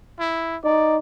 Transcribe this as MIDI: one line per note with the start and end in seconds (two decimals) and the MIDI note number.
0.19 0.57 64
0.64 0.98 63
0.64 0.97 74